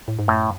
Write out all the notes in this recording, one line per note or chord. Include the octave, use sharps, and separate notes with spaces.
A2
G#2
F#2 A2